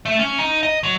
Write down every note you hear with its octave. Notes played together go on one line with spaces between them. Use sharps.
A3
C#4
D#4
D#5
F#3